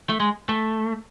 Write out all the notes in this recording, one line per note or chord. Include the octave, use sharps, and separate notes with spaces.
A3
G#3
A3